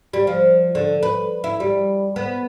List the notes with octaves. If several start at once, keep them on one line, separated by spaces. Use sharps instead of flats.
G3
F3
D3
B4
E4
G3
B3